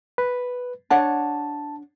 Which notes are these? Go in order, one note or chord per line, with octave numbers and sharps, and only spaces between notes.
B4
D4 C#5 F#5 A5